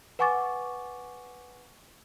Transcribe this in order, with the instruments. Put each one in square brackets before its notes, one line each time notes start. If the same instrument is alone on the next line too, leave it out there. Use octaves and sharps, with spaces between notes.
[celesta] B4 F#5 G#5 C#6 D6 A6